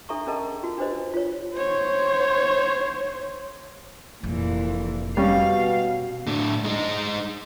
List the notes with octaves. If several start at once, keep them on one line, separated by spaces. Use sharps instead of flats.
D4 A4 E5 A#5 C#6
C#4 G#4 A#4 D#5 A5 A#5
F4 F#4
D4 F#4 G4 B4 C5 D#5
F4 C#5
C5 C#5
F1 A#2 E3
B2 G3 C#4 F5
A2 D3
G#3 D#4